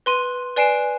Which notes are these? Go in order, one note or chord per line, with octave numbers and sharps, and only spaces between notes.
B4 C6 D#7
B4 D5 G#5 C7 D7 E7